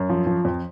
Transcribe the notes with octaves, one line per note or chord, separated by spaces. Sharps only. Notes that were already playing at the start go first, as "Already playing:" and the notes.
Already playing: F#2
F3
F3
F2